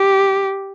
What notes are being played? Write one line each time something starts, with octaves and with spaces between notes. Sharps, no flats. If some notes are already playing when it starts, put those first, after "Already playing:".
Already playing: G4